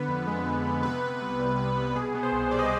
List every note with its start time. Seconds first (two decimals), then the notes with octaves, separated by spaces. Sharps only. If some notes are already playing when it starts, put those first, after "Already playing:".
Already playing: D3 B3 B4
0.08 F2
0.27 G#3
0.46 D3
0.65 B3
0.83 C3 B4
1.02 B3
1.21 C2
1.39 G3
1.58 C3
1.77 B3
1.95 B2 G#4
2.15 B3
2.23 C5
2.32 C2
2.51 G3 D5
2.59 D#5